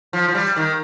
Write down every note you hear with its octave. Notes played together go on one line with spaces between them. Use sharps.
F3
F3
G3
D#3